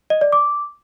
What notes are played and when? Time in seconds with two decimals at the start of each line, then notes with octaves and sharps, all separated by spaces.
0.10 D#5
0.21 D5
0.32 D6